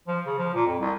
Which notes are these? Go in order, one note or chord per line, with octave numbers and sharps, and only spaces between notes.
F3
C#3
F3
A#2
F2
C2